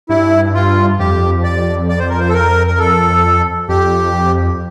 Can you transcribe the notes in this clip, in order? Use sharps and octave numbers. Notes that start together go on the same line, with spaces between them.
G2 E4
F4
F2 G4
D5
D5
C5
A#4
C5
A4
A#4
A#4
A4
F2 G4